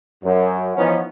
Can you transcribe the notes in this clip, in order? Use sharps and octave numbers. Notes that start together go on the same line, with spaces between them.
F#2
E3 F3 B3 C#4 D#4